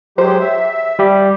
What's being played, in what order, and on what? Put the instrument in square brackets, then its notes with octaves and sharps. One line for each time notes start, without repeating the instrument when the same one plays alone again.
[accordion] F#3 G#3 G4 [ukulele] C5
[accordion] E5
[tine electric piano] G3 G4